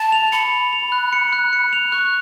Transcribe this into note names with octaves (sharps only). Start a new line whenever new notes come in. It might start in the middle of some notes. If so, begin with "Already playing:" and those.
Already playing: A5 A6
F7
B5 C#7
F7
F7
F#6
C#7
F#6
C#7
F7
C#6 F#6